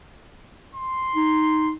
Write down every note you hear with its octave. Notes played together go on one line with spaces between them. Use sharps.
C6
D#4